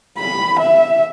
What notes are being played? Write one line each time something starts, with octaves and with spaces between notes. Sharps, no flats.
B5
E5